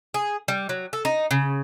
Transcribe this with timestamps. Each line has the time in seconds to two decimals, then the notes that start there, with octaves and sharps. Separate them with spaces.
0.14 G#4
0.48 G3
0.69 F#3
0.93 A4
1.05 D#4
1.31 C#3